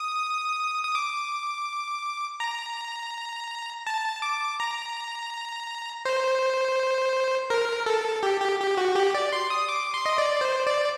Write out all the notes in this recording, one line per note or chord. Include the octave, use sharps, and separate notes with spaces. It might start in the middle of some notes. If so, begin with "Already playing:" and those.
Already playing: D#6
D#6
D6
A#5
A5
D6
A#5
C5
A#4
A4
G4
G4
G4
F#4
G4
D5
C6
D#6
D6
C6
D#5
D5
C5
D5